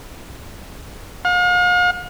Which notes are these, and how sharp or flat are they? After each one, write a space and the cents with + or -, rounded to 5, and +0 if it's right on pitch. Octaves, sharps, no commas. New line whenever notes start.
F5 +45